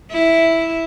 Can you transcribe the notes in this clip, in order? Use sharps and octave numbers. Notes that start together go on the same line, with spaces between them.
E4